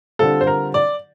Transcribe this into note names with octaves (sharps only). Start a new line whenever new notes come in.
D3 G3 C4 F4 A4
C5
A#4
D5